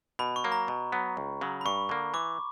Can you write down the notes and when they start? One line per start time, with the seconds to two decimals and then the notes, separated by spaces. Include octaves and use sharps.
0.19 B2 B5
0.36 C#6
0.44 F#3 A#3
0.52 A#5
0.68 B2
0.92 F#3 B3
1.17 C#2
1.41 C#3 F#3
1.61 B5
1.66 G2 C#6
1.89 D3 A#3
2.14 E3 D6